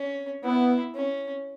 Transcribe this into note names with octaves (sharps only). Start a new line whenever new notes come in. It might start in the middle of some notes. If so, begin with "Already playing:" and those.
Already playing: C#4
B3 E4
C#4